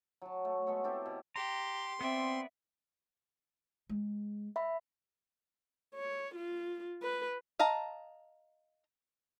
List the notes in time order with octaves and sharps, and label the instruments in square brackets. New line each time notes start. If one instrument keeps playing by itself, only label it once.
[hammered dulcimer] F#3 A5
A3
G#3 B3 A4 C#5
C4 E4 G4 A4
B2
[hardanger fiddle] G4 [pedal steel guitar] A#5 [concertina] C6
[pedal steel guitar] B3 D5 [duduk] C4 [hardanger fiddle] E5
[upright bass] G#3
[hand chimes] E5 B5
[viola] C#5
F4
B4
[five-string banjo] D#5 F5 A5 A#5